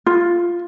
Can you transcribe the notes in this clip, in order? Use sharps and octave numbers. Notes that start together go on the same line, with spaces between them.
F4